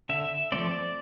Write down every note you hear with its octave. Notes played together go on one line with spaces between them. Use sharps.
D3 E5
F3 A3 C4 D5